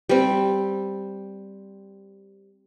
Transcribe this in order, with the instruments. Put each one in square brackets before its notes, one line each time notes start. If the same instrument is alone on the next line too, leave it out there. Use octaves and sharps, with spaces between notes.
[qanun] G3 C4